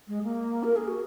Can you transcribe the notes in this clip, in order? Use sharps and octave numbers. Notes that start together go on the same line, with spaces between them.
G#3
A#3
A#4
G#4
F#4